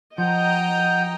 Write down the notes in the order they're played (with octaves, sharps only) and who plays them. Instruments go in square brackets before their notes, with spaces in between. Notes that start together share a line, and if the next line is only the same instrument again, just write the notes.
[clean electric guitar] F3 [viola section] D#5 G5 A#5 [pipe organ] F#5 G6